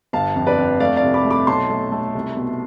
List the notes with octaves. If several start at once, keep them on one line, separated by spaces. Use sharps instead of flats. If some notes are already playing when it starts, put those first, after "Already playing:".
G1 F5 A5
F2
B4 D5
F2
A3 D5 F5
D5 F5
C2
B5 D6
A3
B5 D6
B1 A5 C6
A3
A3
C2
B2